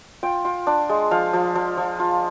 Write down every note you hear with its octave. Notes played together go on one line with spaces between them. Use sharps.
F4 G5
F4
D4
G#3
F3 F5
F3
F3
F3
F4